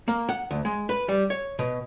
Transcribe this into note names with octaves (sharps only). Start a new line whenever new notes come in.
A#3
F#5
D2
G#3
B4
G3
C#5
B2